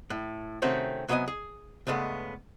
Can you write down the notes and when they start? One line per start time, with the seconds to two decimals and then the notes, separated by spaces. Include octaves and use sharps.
0.10 A2
0.62 C3 D#3 A3 C4 C#4 F#4
1.08 C3 F#3 B3 B4 D#5 G#5
1.28 G#4
1.87 C#2 G2 G#3 A3 B3